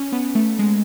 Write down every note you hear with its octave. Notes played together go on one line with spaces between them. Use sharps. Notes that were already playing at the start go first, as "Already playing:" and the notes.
Already playing: C#4
B3
A3
G#3